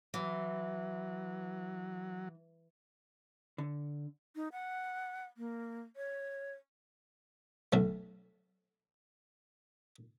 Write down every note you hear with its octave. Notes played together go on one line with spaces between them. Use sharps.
E3 F#3
D3
D#4
F#5
A#3
C#5
B1 A3